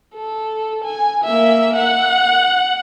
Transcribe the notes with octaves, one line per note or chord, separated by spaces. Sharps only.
A4
G#5
A#3 E5
F#5